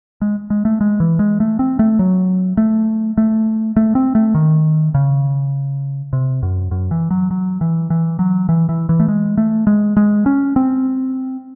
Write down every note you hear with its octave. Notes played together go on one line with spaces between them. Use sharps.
G#3
G#3
A3
G#3
E3
G#3
A3
C4
A3
F#3
A3
A3
A3
C4
A3
D#3
C#3
C3
F#2
F#2
E3
F#3
F#3
E3
E3
F#3
E3
E3
E3
A3
G#3
A3
G#3
G#3
C#4
C4